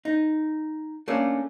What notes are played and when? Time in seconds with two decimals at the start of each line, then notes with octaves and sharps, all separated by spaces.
0.05 D#4
1.08 A3 A#3 C#4 D4